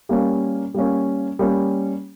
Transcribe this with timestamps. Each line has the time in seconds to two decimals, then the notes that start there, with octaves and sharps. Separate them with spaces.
0.09 G3 A#3 C#4
0.74 G3 A#3 C#4
1.39 G3 A#3 C#4